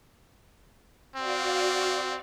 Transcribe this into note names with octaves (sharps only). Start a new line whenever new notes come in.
C4 F#4 D5 F5